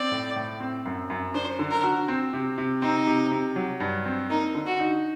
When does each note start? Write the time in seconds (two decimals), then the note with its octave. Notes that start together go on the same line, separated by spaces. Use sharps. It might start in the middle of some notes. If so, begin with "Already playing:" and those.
Already playing: C4 D5
0.11 A2
0.36 A2
0.60 C4
0.85 F#2
1.10 F#2
1.34 D4 C5
1.59 D3
1.71 A#4
1.84 F#4
2.08 C4
2.33 C3
2.58 C3
2.82 C4 D#4
3.07 C3
3.31 C3
3.56 F#3
3.80 G2
4.05 C4
4.30 A#3 D#4
4.55 D3
4.66 F#4
4.79 D#4